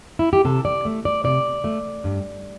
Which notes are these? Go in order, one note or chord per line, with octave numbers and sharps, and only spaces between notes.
E4
G4
C3 A4
D5
A3
D5
C3 D5
A3
G2